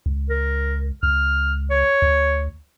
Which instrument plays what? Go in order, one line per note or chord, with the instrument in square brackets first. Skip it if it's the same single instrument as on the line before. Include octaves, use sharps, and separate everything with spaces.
[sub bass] C#2
[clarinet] A#4
[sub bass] C#2 [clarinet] F6
[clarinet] C#5
[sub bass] D2